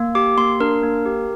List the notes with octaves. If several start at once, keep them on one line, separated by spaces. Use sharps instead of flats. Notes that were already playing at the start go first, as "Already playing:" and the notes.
Already playing: A#3
G4 D6
A#3 C6
D4 A#4
A#3
G4